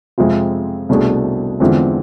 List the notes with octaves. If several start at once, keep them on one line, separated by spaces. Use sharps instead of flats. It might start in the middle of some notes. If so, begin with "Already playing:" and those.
F2 C3 G#3 C4 F4
C2 B2 A3 D4 G#4
E2 D3 F3 G#3 C4